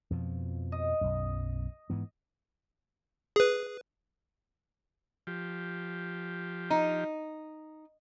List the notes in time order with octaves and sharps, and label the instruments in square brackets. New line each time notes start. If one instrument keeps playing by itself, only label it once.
[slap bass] F2 B2 F3
[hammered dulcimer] D#5
[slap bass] B1 F#2
G#2 E3 B3
[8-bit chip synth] G#4 B4
[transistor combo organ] F3 G4
[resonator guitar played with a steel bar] D#4